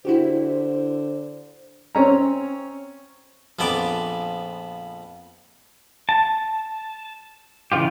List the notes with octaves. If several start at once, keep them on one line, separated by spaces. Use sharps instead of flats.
D3 E4 F#4 G4 C5
C4 C#4 A#5
A#1 F2 B3 A5 D6
A5
C#3 E3 F4 G4